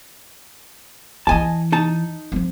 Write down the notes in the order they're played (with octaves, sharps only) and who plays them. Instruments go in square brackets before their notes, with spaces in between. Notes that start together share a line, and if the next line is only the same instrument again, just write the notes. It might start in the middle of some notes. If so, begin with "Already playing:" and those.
[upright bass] E2 E3 [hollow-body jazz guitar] D#5 G#5 A5
[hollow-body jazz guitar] D#4 A5
[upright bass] F3 C4